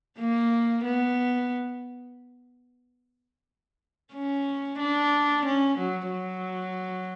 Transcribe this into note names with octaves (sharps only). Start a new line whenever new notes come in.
A#3
B3
C#4
D4
C#4
F#3
F#3